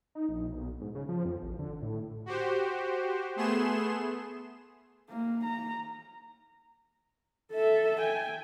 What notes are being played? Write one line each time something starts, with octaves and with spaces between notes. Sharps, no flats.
D#4
A#1
B1
G#2
C#3
F3
F2
A1
D3
A2
F#4 G4 C5
A3 B3 G#4 C6 E7
A#3
A#5
A4 E5
G5 G#5